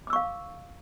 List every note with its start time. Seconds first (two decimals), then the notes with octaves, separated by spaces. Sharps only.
0.07 D6
0.10 E6
0.13 C#6
0.16 F5